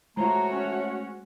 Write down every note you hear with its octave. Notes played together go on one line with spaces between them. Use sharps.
G#3 A3 F#4 C5 C#5 A#5
C#4